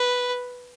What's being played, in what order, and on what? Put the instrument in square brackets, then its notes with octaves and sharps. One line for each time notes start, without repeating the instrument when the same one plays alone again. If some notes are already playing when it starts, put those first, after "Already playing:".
Already playing: [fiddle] B4